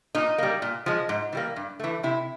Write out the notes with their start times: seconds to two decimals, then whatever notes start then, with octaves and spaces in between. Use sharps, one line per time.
0.15 A#2 D#4
0.38 G3 A#3
0.62 A#2
0.86 F3 G#3
1.09 G#2
1.33 E3 G3 A#3
1.56 G2
1.80 E3 A3
2.03 C3 E4